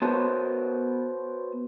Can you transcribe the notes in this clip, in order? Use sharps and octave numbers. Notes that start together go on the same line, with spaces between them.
B3 F#4 A#4 C5 C#5 A5